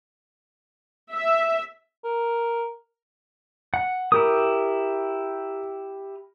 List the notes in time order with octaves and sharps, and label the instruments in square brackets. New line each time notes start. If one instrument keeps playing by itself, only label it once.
[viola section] E5
[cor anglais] A#4
[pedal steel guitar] F#5
[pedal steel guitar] E4 G4 D#6 [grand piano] A#4